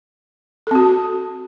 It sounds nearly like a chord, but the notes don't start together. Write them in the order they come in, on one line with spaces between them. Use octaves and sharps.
A4 C4 F#4